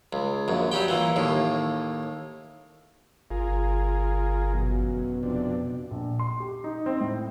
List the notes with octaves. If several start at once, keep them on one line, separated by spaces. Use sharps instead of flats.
C#2
A#1 F#2
F#3 G3 G4 G5
A#2 E3
D#2 A2
G1 F4 G#4 A#4
F#2 B2
F2 C3 D4
A#1
C6
G4
D#4
C4
A2